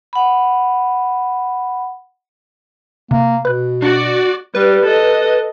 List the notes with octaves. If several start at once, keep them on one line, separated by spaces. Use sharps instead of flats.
F#5 B5
C3 A#3
B2 B4 F#6
D4 F#4 D5 C#7
G3 B4
A4 D#5